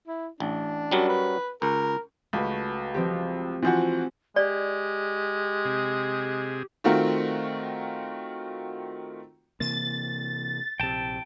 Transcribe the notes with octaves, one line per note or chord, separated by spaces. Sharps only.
E4
A1 D4
F#2 F#3 G3
B4
C#2 A#4
C#2 A3 F#4 B4
F3 C4 G4
E3 F3 C4 F#4
G#3 G4 D5
C3 G#4
D#3 A3 C4 F4 F#4 A#4
C3 E3 A#3 A6
A#1 C3 G5 A5